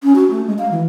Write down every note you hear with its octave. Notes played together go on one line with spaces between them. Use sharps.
C#4
F#4
A3
G#3
F5
E3